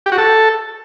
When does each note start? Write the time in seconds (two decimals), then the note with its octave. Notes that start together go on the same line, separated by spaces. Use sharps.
0.06 G4
0.12 F#4
0.18 A4